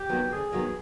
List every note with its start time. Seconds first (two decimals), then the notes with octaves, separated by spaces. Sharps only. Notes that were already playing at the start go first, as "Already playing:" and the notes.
Already playing: G4
0.09 C3 D#3 F#3 B3
0.31 D2 G#4
0.52 C3 D#3 F#3 B3